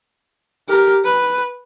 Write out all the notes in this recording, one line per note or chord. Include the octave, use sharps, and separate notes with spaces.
G4 A#4
B4